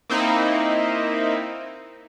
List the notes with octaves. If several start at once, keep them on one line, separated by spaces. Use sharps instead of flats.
A#3 C4 D#4 E4